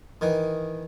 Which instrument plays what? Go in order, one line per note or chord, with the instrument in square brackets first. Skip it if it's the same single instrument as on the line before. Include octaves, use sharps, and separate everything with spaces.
[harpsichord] D#3 E3